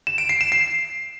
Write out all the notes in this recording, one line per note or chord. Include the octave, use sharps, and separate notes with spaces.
E7
D7
C7
E7
C7